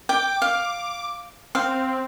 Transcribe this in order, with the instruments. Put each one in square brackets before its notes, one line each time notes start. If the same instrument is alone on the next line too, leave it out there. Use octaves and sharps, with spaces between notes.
[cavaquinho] G5 [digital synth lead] D6
[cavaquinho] F5
[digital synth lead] C4 [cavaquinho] F5